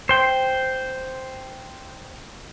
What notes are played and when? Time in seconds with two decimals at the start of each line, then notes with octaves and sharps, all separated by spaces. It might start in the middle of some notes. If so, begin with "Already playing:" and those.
0.09 C5 G5